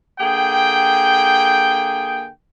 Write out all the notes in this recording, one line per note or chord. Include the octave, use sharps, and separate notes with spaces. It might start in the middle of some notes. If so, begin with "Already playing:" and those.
D3 A#3 G#4 G5